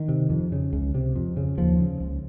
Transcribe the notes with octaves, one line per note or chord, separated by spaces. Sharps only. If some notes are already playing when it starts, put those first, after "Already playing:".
Already playing: D#3
C3
F2
C#3
C#2
C3
F2
C#3
D#2 F3
C#3
C#2